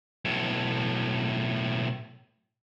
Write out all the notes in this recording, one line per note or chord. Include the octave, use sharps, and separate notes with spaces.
B1 A2